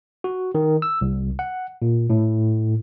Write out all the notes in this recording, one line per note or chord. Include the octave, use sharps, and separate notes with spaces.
F#4
D#3
E6
C2
F#5
A#2
A2